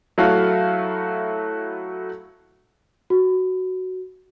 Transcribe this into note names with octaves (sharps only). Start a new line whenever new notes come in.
F#3 A3 E4 F#4 A4 F5
F#4